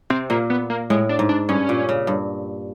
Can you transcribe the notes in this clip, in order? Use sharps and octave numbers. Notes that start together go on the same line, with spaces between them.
C3 C4
A#2 A#3
B3
A#3
A2 G#3
D4
G#2
D4
G2 C#4
A#2
C#3
G2